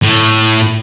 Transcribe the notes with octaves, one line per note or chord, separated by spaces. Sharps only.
A2